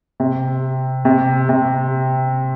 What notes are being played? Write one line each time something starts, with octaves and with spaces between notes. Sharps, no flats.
C3
C3
C3